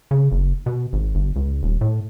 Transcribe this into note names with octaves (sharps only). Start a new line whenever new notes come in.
C#3
F#1
B2
G#1
G1
C#2
D#1
A2